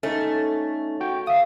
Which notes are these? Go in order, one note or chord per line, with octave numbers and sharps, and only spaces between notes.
A3 C#4 D#4
F#4 G5
E5 F5 D#6